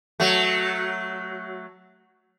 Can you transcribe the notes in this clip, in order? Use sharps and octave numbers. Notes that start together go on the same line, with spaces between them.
F#3 A3